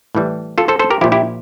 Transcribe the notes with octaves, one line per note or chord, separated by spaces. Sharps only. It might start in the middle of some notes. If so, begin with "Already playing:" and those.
A2 E3 G3
F4 A4
A4 C5
A4 C5
G4 A#4
A#2 F3 E4 G4
E4 G4